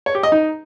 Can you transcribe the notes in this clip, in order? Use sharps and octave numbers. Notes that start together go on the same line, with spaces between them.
C#5
G4
D#5
D#4